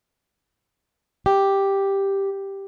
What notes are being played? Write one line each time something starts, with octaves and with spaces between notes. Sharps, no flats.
G4